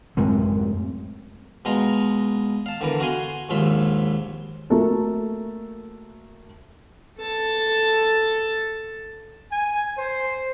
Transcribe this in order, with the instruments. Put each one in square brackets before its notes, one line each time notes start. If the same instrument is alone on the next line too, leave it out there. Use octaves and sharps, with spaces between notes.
[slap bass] F#2 A2 G#3 C4
[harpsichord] B2 G#3 F4 A#5
F5 A5
D3 E3 A#4
F#4 F5 G#5 C6
A#1 D#2 G#2 F4 E5
[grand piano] A3 A#3 F#4 A4 A#4
[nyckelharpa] A4 A5
[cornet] G#5
C5